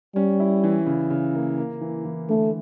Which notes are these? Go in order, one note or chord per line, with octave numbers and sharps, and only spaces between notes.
G3 C#4
E4
E3
C#3
C#3
A#3
A#3
E3
E3
D3 A3